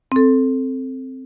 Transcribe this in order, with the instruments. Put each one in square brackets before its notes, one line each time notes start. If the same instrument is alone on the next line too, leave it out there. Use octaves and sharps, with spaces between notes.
[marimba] C4 A4